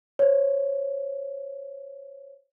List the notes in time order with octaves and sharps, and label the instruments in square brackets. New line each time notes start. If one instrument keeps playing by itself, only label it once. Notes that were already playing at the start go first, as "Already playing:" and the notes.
[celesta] C5 C#5